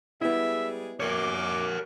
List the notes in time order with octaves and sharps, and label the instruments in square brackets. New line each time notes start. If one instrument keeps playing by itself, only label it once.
[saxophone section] G3 G#3 G#4 [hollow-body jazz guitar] B3 E4 [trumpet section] E5
[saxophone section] A#3 [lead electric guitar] A#4 C#5 [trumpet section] D6